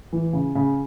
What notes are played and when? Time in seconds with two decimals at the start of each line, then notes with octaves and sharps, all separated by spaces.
0.13 E3
0.33 C#3
0.55 C#3